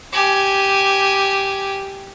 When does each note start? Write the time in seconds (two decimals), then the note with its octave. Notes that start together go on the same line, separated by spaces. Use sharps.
0.13 G4 G#5